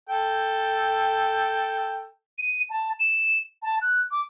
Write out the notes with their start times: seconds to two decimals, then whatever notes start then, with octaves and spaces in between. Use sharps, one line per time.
0.09 A4 G5
2.39 D#7
2.70 A5
3.00 E7
3.63 A5
3.82 F#6
4.11 D6